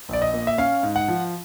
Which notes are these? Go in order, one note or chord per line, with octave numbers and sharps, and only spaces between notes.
A#1 D5
D#5
A#2
E5
C#4 F5
G#2
F#5
F3